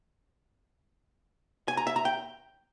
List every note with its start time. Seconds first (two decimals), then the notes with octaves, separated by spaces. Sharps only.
1.68 G#5
1.77 A#5
1.87 E5
1.96 A#5
2.05 G5